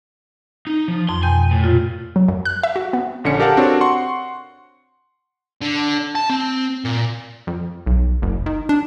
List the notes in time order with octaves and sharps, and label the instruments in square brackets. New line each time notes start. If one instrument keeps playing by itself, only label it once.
[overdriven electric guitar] D#4
F3
[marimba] F2 [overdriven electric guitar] C6
[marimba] B2 G5 G6 [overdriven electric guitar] G#5
[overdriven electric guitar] A2
[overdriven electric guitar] A#2 [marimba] F4
[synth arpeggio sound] F#3
F#2
F#6
E5
F#4
B3
[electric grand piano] A#1 D3 C#4 C#7
G4 A4 A#4 F5 F#5 A5
C4 D4 F#4 C#5
F#5 C6 C#6
[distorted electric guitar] D3
A5
C4
A#2
[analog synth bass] F2
B1
F#1
D#3
D4